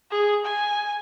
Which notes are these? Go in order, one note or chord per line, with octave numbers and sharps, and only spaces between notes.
G#4
G#5